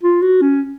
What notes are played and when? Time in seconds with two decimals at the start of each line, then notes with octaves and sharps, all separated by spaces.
0.03 F4
0.22 F#4
0.41 C#4